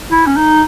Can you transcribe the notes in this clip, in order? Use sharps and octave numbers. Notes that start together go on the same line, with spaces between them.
E4
C#4
D#4